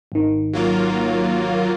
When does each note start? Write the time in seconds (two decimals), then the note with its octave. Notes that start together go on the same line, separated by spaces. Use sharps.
0.12 G#1 D#3
0.53 F#3 A#3 F4